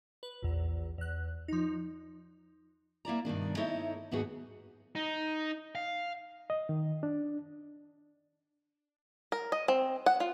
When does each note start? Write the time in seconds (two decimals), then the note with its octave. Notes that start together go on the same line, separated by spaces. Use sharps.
0.23 B4
0.42 A#1 E2
0.98 E2 F#6
1.48 F3 D#4
3.05 A#3 E4 D5 A#5
3.25 G2 B2 D#3 D4
3.57 A3 D#4 E4 A4 C#5 D#5
4.11 D#2 G#2 B3 D#4 F#4 G#4
4.95 D#4
5.75 F5
6.50 D#5
6.69 D#3
7.03 D4
9.32 A#4
9.52 D#5
9.68 C4
10.06 F#5
10.20 F4